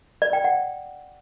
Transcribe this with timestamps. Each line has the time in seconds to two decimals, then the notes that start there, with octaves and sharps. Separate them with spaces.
0.22 D5
0.33 G5
0.44 F#5